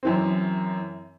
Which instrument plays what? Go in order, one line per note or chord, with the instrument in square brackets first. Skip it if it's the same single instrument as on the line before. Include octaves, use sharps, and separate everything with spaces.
[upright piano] F#2 E3 C4